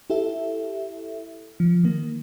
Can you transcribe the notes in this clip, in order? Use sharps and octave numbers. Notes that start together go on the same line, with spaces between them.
E4 G4 A4 E5
F3
D#3 A#3